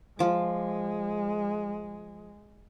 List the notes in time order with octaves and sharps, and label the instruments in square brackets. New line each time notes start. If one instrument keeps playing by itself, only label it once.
[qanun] F3 D6 [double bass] G#3